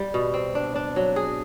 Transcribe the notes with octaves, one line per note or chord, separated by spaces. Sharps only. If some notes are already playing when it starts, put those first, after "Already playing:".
Already playing: G3
B2
C4
D4
D4
F#3
G#4